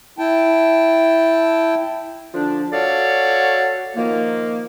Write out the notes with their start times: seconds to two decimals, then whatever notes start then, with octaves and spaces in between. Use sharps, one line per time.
0.19 E4 G5 A5
2.33 D3 F3 D4
2.72 F#4 A4 C#5 D5 F5
3.96 D#3 F3 A#3